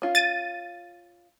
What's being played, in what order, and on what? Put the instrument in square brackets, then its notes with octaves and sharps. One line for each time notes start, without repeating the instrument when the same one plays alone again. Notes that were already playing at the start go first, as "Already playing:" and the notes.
[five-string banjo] C#4 F4
[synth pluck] A6 D#7